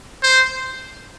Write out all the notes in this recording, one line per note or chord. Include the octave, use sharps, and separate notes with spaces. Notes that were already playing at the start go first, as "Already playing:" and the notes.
C5